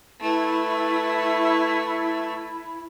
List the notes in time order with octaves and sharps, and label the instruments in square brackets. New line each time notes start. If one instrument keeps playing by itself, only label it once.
[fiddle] A3 B4 [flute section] E4